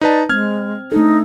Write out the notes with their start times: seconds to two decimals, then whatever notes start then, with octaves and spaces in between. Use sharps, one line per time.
0.01 D#4 B4 D5 A5
0.29 G#3 C4 F6 G#6
0.92 A3 D4 D#4 A4